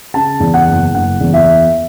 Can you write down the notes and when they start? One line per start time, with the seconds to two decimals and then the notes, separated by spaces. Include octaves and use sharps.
0.14 C#3 A5
0.40 E2
0.54 F#5
0.67 F#1
0.94 F#1 F#5
1.21 E2
1.34 E5